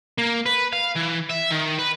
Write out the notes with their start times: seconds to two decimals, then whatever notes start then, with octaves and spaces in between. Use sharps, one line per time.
0.18 A#3
0.46 B4
0.73 F5
0.96 E3
1.30 E5
1.52 D#3
1.79 B4